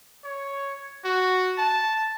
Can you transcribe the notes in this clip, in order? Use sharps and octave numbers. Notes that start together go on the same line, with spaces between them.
C#5
F#4
A5